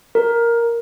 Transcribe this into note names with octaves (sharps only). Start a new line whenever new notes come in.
A#4